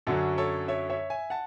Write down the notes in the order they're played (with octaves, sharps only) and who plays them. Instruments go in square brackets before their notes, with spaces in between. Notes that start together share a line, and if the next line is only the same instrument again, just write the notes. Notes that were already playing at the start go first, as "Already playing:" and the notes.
[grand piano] F#2 D3 F#3 C#4 F#4 A4
A4 C#5
C#5 E5
C#5 E5
E5 G#5
F#5 A5